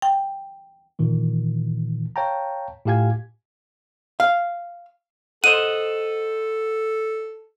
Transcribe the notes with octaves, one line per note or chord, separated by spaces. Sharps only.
G5
A#2 D#3 E3
C#5 F5 G5 A5 A#5
A2 F4 G4 F5 G#5 G#6
F5
A4 C5 D#5 F#5 D#7